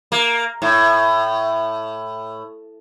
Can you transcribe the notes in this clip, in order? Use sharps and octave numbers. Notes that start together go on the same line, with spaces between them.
A#3
A2